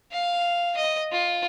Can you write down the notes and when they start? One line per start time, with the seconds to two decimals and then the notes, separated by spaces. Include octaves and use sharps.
0.12 F5
0.77 D#5
1.12 F4